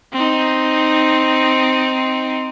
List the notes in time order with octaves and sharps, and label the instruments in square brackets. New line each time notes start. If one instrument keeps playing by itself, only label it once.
[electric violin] C4 D#4